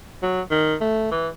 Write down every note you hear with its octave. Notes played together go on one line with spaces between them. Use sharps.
F#3
D#3
A3
E3